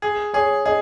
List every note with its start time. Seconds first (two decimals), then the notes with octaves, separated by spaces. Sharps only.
0.02 G#4
0.34 G#4 C#5
0.65 G#4 D#5